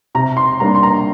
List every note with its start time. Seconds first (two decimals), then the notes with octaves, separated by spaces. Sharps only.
0.15 C3 A#5
0.37 C6
0.60 G3 A#3 D4 A#5
0.75 C6
0.83 A#5